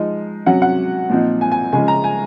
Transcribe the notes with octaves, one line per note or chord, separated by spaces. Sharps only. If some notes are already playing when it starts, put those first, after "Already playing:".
Already playing: F3 G#3 D#4
C3 F#3 C#4 F#5
F#5
A#2 F3 C4 D#4
G#5
G#5
C#3 F3 G#3 C#4 G#5
A#5
G#5